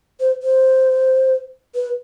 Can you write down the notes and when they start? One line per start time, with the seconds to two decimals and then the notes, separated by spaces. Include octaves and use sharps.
0.20 C5
0.43 C5
1.75 B4